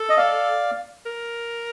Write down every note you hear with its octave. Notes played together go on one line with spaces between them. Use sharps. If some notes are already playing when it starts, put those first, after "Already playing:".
Already playing: A4
D#5
D5 F5
A#4